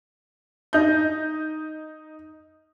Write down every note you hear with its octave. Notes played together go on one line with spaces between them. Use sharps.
D#4 G6